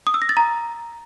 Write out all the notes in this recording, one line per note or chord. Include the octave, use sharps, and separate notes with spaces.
D#6
E6
A#6
A6
A#5